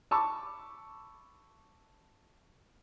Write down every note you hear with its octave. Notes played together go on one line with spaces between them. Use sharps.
A5 B5 C#6 D6 E6